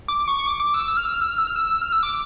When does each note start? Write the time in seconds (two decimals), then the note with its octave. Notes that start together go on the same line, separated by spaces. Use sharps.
0.08 D6
0.28 C#6
0.46 D6
0.60 D6
0.74 E6
0.88 E6
0.97 F6
1.05 E6
1.14 F6
1.22 E6
1.31 F6
1.38 E6
1.47 F6
1.56 E6
1.82 F6
1.92 E6
2.03 D6